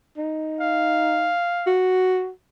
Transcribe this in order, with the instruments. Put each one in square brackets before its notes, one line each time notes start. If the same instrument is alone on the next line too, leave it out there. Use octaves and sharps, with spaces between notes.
[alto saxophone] D#4
[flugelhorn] F5
[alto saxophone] F#4